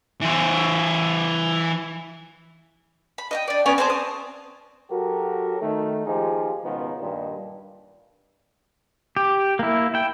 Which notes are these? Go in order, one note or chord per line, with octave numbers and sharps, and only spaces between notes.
E3 C5
B5
D#5 E5 G5
D4 D5
B3 C#4 D5 G#5
C4 G#4 C5 A5
D#6
F#3 F#4 G4 A4 A#4
D#3 A3
D#2 F3 D#4 F4 G4 G#4
G#1 C#2 B2 D#3 B3 F4
G2 A#2 D#3
G4
A#3 E4
E4 G5